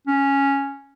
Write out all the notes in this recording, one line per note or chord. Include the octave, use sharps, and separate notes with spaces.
C#4